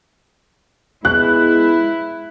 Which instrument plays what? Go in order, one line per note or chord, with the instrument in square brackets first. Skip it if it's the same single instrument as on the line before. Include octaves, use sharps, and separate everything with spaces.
[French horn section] G#3 B3 [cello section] E4 [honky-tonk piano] F#6